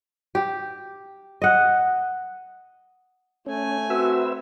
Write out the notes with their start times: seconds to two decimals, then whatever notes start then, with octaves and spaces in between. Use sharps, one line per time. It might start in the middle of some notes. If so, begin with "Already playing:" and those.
0.35 G4
1.42 D#5 F#5
3.46 A3 C#4 G#5
3.90 C4 F#4 B4 E5 E6